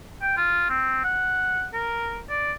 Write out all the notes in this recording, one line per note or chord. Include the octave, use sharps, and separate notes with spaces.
G5
F4
C4
F#5
A#4
D5